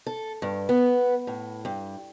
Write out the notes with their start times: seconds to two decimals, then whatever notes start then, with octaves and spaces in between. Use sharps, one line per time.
0.07 A4
0.42 G2
0.69 B3
1.27 A2
1.65 G2